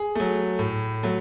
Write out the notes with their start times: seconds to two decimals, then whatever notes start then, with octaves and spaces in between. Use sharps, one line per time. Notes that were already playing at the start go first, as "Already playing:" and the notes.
Already playing: G#4
0.15 F#3 A3
0.59 A2
1.03 F#3 A3